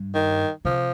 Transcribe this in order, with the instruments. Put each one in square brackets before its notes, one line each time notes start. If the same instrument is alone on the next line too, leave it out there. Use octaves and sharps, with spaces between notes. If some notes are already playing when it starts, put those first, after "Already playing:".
Already playing: [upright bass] G2
[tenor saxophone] D#3
[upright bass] C3 [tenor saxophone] F3